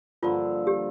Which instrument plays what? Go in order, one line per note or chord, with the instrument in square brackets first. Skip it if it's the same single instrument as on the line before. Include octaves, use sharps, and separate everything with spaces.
[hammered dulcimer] G2 D3 F3 A#3 [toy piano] F4
[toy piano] G4